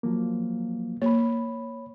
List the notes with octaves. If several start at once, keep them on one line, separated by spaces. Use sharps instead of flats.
F3 F#3 A#3
A#3 C#5 B5